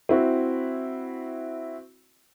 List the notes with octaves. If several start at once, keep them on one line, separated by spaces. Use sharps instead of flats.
C4 E4 F#4